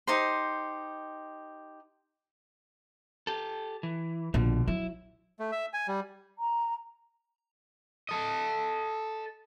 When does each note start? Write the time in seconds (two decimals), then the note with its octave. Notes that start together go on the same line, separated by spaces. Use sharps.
0.07 D#4 G4 C5
3.27 G4 A4
3.83 E3
4.34 A#1 B2 D3
4.68 F#3 E4
5.40 A3
5.52 E5
5.73 G#5
5.88 G3
6.39 A#5
8.09 A4 D#5